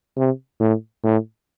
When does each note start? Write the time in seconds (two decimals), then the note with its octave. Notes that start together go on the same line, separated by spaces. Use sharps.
0.17 C3
0.60 A2
1.04 A2